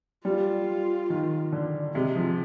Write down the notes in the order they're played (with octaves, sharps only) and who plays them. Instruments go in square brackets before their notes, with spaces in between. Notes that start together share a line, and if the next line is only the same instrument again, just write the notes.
[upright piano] G3 [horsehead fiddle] F4
[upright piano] D#3
D3
[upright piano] C3 [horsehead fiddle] G#3
[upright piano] F3